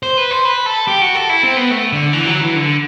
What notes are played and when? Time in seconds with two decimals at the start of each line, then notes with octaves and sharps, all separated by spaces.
0.03 C5
0.17 B4
0.31 C5
0.45 B4
0.66 A4
0.88 G4
1.01 F#4
1.15 A4
1.29 E4
1.43 C4
1.57 B3
1.71 A3
1.93 D3
2.13 E3
2.26 F#3
2.41 E3
2.55 D3